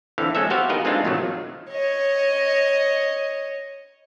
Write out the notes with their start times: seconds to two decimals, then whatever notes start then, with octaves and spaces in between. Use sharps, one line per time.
0.18 D3 E3 C4 E4 A4 F5
0.35 G#3 A3 C4 C#4 A4 E5
0.50 B3 F#4 G4 C5 E5 F5
0.70 D#4 F4 G#4 A#4 B4 D#5
0.85 G#3 A3 C4 D4 D#4 F4
1.05 A2 C3 D#3 F3 F#3 A3
1.70 C#5 D#5